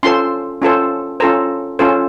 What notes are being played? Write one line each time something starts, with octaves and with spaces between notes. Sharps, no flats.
C#4 F4 A4 C5 C6
C#4 F4 A4 C5
C#4 F4 A4 C5 A#5
C#4 F4 A4 C5